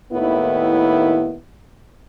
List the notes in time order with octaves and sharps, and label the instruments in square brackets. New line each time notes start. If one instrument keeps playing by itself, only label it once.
[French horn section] D#2 A2 D#3 B3 E4